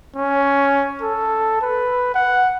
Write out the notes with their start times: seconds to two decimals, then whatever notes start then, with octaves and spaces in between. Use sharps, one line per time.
0.16 C#4
1.02 A4
1.62 B4
2.15 F#5